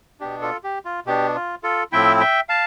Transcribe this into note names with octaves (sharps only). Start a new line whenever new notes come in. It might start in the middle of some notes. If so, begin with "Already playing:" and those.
B2 B3 D4 G4
F4 A4
G4
F4
B2 B3 D4 G4
F4
F4 A4
A2 F3 C4 E4 E5 G5
E5 G5
F5 A5